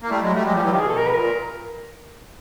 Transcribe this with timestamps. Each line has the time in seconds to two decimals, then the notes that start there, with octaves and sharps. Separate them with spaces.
0.02 A#3
0.10 G3 A3 E4
0.21 F#3 G#3
0.27 F#4
0.33 G3 A3
0.44 F#3 G#3 G4
0.53 F3 G3
0.62 E3 F#3
0.71 D#3 F3 G4
0.80 B2 G#4
0.89 A4
0.97 A#4
1.07 B4
1.14 A#2 A#4